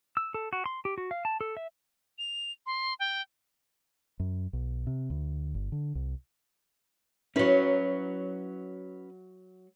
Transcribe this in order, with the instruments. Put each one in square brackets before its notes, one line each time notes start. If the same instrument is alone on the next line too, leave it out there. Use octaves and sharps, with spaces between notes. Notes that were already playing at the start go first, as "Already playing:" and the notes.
[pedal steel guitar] E6
A4
F#4
C6
G4
F#4
F5
A5
A4
E5
[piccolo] F7
C6
G5
[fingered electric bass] F#2
B1
C3
D2
G1
D3
C2
[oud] F#3 E4 [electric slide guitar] C#4 B4